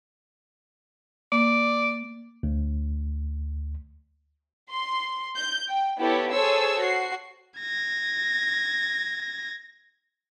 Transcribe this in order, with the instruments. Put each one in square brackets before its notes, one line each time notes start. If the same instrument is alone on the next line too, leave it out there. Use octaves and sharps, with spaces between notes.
[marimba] A#3 [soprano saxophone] D5
[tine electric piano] D2
[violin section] C6
G6
G5
B3 E4 G4 A4 C#5
G#4 A4 C5 C#5 E6
F#4 C7
[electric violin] G#6 A#6